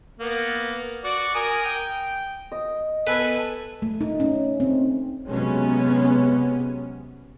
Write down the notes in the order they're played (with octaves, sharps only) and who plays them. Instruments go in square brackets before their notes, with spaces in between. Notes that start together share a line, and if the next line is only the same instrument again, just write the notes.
[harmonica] A#3 B3
F#4 D5
A#4 G#5 D#6
G5
[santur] D#5
[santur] B3 [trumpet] A4 [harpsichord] B4 [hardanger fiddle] G#5
[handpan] A3
D#4
C#4
C4
[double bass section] C3 F#3 G#3 B3 C#4